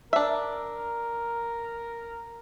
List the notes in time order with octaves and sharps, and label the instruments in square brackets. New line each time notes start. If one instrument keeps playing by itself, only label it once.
[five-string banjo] D4 E5 [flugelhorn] A#4